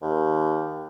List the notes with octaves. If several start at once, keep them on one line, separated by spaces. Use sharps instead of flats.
D#2